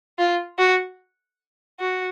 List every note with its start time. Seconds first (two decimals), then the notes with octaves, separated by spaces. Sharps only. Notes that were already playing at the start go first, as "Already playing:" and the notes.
0.19 F4
0.58 F#4
1.80 F#4